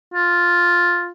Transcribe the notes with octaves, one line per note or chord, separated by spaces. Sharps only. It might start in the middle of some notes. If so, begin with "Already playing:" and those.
F4